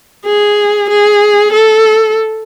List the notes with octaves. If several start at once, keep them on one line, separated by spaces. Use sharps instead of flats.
G#4
G#4
A4